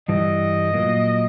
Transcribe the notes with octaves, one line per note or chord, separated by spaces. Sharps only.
G2 E3 G3 D#5
A#2 F#3 A#3